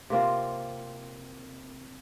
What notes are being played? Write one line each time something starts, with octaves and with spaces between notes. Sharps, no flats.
C3 A#3 C4 F4